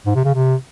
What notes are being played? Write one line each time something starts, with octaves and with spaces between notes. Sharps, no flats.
G#2
C3
C#3
C3